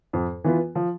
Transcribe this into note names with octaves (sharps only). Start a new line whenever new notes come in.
F2
E3 B3 F4 B4
F3